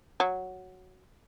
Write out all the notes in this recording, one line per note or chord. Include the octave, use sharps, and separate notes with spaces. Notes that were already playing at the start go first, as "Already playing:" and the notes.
F#3